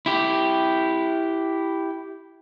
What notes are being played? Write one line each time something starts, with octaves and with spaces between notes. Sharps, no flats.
E4 G4